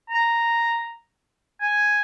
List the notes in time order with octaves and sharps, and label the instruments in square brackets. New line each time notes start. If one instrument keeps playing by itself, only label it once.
[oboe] A#5
G#5